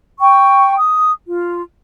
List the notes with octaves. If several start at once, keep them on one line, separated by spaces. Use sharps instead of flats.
G5 C#6
D#6
F4